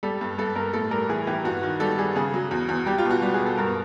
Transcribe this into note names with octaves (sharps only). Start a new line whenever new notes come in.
G3 A4
G2
G2 A4
G2 A#4
A2 A4
G3 A#4
E3 G#4
E3 G4
G2 F#4
D#3
G3 A4
G3 G#4
C#3 G#4
F#3
E2
E2
G3 G4
F4
B2
F#4
G3
G#4
B2
A4
G2 A#4